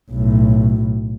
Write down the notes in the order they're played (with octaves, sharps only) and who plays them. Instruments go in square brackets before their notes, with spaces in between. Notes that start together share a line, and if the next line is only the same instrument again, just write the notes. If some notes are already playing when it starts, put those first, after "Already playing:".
[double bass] B1 A2